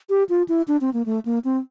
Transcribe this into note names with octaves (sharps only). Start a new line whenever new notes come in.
G4
F4
E4
D4
C4
A#3
A3
A#3
C4